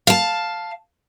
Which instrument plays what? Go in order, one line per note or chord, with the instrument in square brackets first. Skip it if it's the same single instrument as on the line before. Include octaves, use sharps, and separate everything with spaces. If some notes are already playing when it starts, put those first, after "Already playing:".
[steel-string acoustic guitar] F5 A5